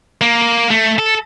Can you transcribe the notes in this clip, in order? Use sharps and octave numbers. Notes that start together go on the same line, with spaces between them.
A#3
A3
A4